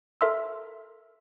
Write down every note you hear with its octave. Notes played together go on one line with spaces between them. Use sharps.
A4 A#4 E5 C6 E6